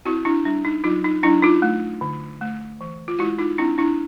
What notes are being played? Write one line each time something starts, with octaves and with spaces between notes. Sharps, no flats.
C4 E4 F#4
D4 E4
G3 D4
D#4
F#3 D#4 F4
D#4
F#3 D4 E4
D#4 F4
A3
D3
A3
E3
F4
G#3 E4 F#4
D#4 F4
C4 D4 E4
D4 E4